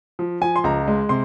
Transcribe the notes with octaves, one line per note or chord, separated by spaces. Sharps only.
F3
F3 G#5
C6
C#2 A#5
G#3
C3 C6